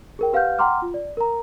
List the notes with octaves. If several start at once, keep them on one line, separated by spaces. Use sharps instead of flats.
G#4 A#4 G5
G4 B4 F5 F#5 F6 G6
F#5 G5 A#5 C6 D6 F6
F4
D5
A#4 A#5